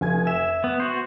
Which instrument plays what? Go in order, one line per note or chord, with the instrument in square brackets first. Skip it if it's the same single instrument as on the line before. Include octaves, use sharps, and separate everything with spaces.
[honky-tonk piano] F1 G#5 G#6
[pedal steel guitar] E5 [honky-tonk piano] E7
[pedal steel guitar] B3
F#4 C5